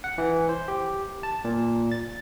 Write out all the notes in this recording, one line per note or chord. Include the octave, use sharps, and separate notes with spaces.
F#5
E3
C5
G4
A5
A#2
A6